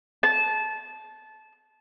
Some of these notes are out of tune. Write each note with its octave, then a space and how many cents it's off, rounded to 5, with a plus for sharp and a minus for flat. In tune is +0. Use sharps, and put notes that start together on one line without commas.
A5 -20